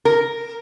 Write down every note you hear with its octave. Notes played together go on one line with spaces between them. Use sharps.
A#4